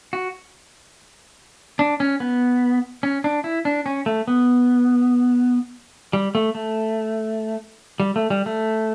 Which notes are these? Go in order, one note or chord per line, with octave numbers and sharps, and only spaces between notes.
F#4
D4
C#4
B3
C#4
D4
E4
D4
C#4
A3
B3
G3
A3
A3
G3
A3
G3
A3